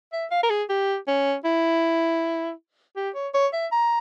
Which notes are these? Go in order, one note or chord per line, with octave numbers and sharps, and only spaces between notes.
E5
F5
A#4
G#4
G4
C#4
E4
G4
C#5
C#5
E5
A#5